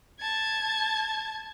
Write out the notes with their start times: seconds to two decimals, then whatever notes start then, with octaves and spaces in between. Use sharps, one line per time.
0.20 A5 G#6